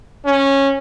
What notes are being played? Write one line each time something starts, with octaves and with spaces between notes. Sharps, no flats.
C#4